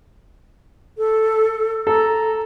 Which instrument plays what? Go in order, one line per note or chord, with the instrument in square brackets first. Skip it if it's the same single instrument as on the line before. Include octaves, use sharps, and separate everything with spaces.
[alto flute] A4
[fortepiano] A4 [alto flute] A#5